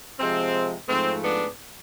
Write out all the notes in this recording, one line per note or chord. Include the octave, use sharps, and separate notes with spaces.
C3 F3 G#3 C4
G#2 F3 A3 C4
B3 D4